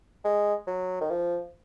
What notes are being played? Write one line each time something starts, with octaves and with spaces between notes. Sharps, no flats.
G#3
F#3
D#3
F3